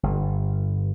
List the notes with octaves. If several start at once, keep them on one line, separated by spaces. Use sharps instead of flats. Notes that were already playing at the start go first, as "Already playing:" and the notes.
G1